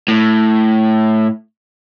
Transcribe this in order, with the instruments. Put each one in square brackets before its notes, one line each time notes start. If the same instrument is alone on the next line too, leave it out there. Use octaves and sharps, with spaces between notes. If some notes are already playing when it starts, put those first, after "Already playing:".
[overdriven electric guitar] A2